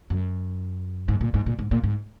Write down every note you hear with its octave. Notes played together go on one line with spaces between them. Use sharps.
F#2
G#2
A#2
G#2
A#2
G#2
A#2
G#2